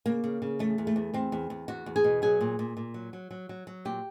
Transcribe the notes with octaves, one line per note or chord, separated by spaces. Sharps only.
C#3 A#3
C#3
C#3
E2 A3
E2
A3
E2
E2 C4
E2
E2
E2 F#4
E2
G#4
B2
F#3 G#4
A#2
A#2
A#2
F#3
F#3
F#3
F#3
F#3
A#2 G4